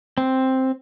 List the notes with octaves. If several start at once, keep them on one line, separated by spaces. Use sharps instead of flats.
C4